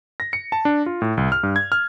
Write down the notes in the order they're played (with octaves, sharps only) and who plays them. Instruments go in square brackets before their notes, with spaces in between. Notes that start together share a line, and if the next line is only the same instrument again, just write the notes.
[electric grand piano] A#6
C#7
A5
D4
F4
A2
C2
F6
G2
G#6
F6